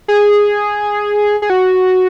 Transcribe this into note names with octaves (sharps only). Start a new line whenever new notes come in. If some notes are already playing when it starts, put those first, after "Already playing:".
G#4
G#4
F#4